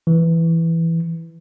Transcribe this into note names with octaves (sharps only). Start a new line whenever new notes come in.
E3